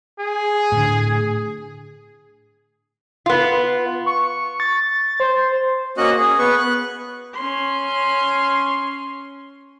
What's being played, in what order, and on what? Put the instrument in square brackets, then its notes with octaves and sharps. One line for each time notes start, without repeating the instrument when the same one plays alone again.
[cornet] G#4
[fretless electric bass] A2 D3
[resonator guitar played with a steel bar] B3 F4
[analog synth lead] C#6
A6
C5
[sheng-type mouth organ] A#3 C#4 F#4 D#5 F#5 F#6
G#4
B3 B4 C#6
F#6
[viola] C#4 C6